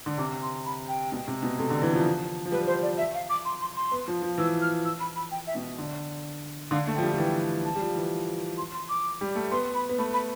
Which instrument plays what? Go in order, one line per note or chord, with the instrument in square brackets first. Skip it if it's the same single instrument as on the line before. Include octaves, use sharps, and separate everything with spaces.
[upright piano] D3
[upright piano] C3 [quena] D6
[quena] C6
B5
G5
[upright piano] B2
C3
B2
[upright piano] C3 [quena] A4
[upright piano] D3
E3
F3
F3
[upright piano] G3 [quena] B4
[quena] C5
D5
E5
F5
D6
C6
C6
C6
[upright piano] B3
F3
F3
[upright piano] E3 [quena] E6
[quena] F6
E6
B5
B5
G5
E5
[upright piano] B2
D3
[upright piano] D3 [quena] F5
[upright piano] A3
[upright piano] F3 [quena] G5
[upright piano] G3
F3
[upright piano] E3 [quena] G5
[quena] A5
[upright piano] G3
F3
E3
[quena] C6
C6
D6
[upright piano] G3
A3
[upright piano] B3 [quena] C6
[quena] B5
[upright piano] B3
[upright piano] A3 [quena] B5
[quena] B5